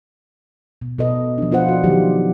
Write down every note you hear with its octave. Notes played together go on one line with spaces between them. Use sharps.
B2
B2 A4 B4 D#5
F3 D4
B3 F4 B4 C5 F#5
F#4 D5
D#3 F3 F#3 D#4 F#4 G4